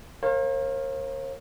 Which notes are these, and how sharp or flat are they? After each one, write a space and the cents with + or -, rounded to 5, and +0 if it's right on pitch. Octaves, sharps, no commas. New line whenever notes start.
A#4 +0 C#5 -45 F5 +0